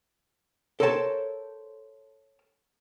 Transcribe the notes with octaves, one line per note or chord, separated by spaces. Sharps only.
A4 A#4 C5 C#5 F#5 A5